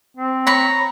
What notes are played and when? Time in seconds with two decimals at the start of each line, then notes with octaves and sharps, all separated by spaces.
0.17 C4
0.47 C#5 A#5 B5 C#6